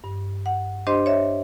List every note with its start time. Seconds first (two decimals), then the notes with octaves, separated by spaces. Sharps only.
0.04 G2
0.46 F#5
0.87 D4 G4 C5 D#5 C6
1.06 C#5 E5